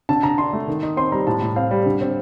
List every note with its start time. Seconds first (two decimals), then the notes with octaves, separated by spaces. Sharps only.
0.09 D3 A5
0.23 D3 A#5
0.38 D4 C6
0.53 A3
0.67 D#3
0.83 D#4
0.97 C4 C6
1.12 G3 A#5
1.27 A2 A5
1.42 A2
1.56 C4 F5
1.71 G3
1.86 D3
2.01 C4